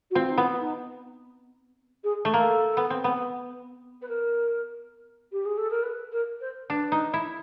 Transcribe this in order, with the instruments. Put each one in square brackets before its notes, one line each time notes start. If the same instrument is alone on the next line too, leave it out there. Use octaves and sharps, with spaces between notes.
[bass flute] F#4
[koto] C4 [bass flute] F4
[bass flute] D#4
[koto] B3 [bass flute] E4
[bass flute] D#4
G#4
[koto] A3
[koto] A#3 [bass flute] A4
[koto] B3
C4
B3
[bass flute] B4
A#4
G4
G#4
A4
A#4
B4
A#4
C5
[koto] D4 [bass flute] B4
[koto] D#4
E4